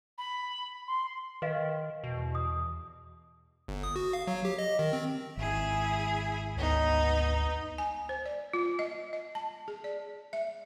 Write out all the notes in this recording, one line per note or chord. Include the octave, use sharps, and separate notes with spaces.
B5
C6
D#3 B4 D#5 F5
E2 B2
D#6
G1
D#6
F#4
F5
F#3
G4
D#5
D#3
C4
G#1 E4 G#4 G#5
D2 B3 D#4
G#5
C5
D5
F4
D#5
D#5
A5
G#4
D5
E5